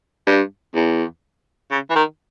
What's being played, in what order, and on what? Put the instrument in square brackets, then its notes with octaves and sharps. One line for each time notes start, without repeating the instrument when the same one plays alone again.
[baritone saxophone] G2
E2
C#3
E3
D#3